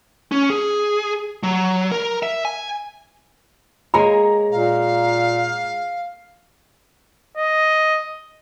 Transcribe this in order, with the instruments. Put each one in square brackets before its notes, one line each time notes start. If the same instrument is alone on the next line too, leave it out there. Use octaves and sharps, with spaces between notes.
[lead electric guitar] C#4
G#4
F#3
A#4
E5
G#5
[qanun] G#3 A#3 C#5 [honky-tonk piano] A#5
[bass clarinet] A#2 [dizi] F5
[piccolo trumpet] D#5